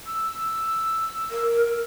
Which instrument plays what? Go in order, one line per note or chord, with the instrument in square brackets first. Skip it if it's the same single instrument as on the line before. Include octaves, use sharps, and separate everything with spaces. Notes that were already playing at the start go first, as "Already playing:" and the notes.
[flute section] E6
[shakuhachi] A#4